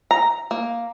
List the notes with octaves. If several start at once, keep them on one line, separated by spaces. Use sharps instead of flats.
A#5
A#3